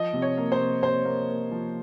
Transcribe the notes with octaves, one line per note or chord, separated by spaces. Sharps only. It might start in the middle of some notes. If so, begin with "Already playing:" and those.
Already playing: F3 D#5
C3
C#5
A#3
C5
C3
C3 C5
A#3
A#3
F3